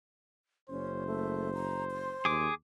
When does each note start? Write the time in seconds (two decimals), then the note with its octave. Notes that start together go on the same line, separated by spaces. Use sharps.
0.70 F#1 C#4 C5
1.07 A3
1.54 A#5
1.91 C6
2.25 D#2 G#4 D6